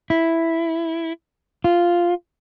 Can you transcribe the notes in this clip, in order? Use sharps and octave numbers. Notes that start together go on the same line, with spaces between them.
E4
F4